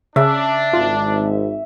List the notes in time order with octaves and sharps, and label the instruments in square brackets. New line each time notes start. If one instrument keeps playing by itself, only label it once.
[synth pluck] C#3 [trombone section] D4 [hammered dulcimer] E5
[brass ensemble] G#1 G#2 [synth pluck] F4